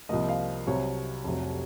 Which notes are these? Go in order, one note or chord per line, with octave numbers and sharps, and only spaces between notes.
C2 C3 F3 A#3 D#5
F5
C2 C3 F#3 C#5
F1 F2 C3 F#3